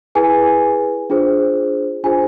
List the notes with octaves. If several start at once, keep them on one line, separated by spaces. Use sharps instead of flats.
E4 G#4 B4 G#5
D4 F4 G#4 C5
D4 F4 G#4 C5 G#5